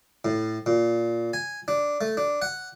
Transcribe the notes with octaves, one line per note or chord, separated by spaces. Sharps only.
A2
A#2
G#5
D4
A3
D4
F#5